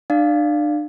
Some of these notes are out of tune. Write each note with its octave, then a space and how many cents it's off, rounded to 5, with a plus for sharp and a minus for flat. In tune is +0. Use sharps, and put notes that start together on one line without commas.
D4 +35 D5 +0 F5 +0